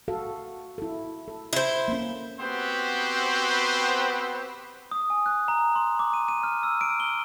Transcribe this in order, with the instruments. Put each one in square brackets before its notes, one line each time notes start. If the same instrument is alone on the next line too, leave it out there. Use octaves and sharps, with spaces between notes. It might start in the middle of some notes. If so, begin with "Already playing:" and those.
[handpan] F#4 A4 F5
E4 A4
A4
[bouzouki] E4 C5
[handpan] A#3 C#4
[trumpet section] B3 C4 F#4 G4 B4 C5
[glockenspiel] D#6
G#5
F#6
A#5
C6
D6
D#7
D#7
F6
E6
D7
G7